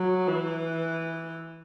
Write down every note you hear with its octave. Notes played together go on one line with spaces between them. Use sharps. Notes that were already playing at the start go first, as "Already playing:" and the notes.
Already playing: F#3
E3